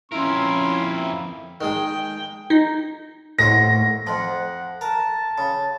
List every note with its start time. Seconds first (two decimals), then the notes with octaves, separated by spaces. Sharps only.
0.12 F2 C#4 E4 A#4 C6
1.61 D#3 G#3 G#4 G5
2.50 D#4
3.39 D#2 A2 C4 F#4 A#6
4.07 F2 F3 F#5
4.81 A#4 A5
5.38 C#3